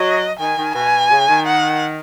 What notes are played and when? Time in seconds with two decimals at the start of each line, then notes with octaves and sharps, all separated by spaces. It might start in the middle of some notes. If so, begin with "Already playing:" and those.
Already playing: F#3 D#5
0.39 D#3 G#5
0.58 D#3
0.75 B2 G#5
1.11 C#3
1.29 D#3
1.47 F#5